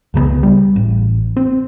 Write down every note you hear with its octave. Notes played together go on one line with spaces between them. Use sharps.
C#2 C#3 F3 B3
G3
A1
C4